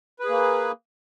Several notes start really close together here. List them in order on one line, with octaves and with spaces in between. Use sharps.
B4 G#4 A#3